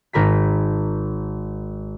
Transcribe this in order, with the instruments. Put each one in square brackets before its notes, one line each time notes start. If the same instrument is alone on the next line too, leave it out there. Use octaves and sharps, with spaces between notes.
[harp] G#1 A#4 B5 B6